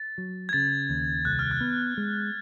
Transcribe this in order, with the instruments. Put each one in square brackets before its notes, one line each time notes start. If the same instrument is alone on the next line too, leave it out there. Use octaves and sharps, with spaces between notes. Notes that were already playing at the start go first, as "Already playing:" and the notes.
Already playing: [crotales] A6
[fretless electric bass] F#3
[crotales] G#6
[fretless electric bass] C#3 [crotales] A6
[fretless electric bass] D#2
[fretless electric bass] C2 [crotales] F#6
[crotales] F6
F#6
[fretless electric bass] B3
G#3